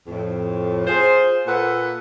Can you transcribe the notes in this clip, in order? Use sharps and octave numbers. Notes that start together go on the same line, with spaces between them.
F2 A2
F4 G#4 C5
A#2 A4 B4 F#5